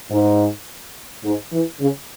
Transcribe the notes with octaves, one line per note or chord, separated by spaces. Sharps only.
G#2
G#2
E3
C#3